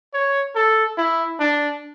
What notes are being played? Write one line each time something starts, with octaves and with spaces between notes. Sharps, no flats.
C#5
A4
E4
D4